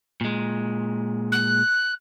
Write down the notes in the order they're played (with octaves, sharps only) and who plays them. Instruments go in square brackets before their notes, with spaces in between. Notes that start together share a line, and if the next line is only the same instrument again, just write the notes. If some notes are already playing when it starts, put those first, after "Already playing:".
[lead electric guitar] A#2 G#3
[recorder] F#6